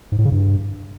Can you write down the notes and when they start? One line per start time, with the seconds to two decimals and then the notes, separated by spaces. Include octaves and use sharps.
0.12 G#2
0.19 A2
0.25 C#3
0.32 G2